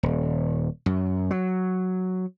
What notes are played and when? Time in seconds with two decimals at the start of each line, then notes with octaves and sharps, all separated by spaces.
0.03 D#1
0.86 F#2
1.31 F#3